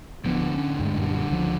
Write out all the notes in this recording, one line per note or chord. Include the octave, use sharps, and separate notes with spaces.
D1 D3 E3 F3 B3
C#4
D2 G2 G#3
F#2 A#2 G3
C#2 F3